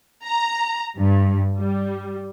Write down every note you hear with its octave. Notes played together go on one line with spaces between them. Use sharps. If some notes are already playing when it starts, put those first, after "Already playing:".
A#5
G2
G3